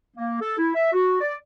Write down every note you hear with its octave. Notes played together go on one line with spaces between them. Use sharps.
A#3
A4
E4
E5
F#4
D5